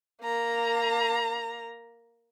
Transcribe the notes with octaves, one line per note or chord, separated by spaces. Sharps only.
A#3 A#5